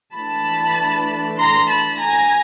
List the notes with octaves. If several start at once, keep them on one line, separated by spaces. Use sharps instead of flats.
E3 A3 D4 A5 B5
A#5 C6
A5 B5
G#5 A#5